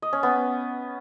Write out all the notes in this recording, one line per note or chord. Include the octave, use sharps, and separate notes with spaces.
D#5
C#4
B3